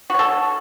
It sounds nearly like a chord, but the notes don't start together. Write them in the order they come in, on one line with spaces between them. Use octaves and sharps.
F#4 C#5 A4